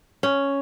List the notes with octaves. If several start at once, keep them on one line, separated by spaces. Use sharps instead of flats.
C#4